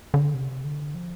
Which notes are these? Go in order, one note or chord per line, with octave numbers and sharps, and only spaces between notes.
D3
C3
D3
F3